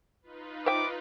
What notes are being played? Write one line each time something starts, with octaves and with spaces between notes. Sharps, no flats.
D#4 F4 B4
C5 E5 G5 D6